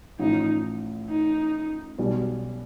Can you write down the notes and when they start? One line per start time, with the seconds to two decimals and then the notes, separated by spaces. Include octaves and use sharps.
0.19 A1 A2 F3 D#4
1.10 D#4
1.98 B1 B2 G3